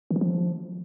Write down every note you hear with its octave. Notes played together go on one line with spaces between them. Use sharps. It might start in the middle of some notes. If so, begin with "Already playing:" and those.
D#3
E3
F3